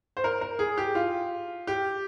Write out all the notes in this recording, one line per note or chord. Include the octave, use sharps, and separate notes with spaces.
C5
A#4
A#4
G#4
G4
F4
G4